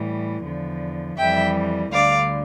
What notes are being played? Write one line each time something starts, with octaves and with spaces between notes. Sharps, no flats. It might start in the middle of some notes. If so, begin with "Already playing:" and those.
Already playing: A2 E3 G3
E2 D3 F3
F2 E3 G3 E5 G5
D2 D3 G3 D5 F5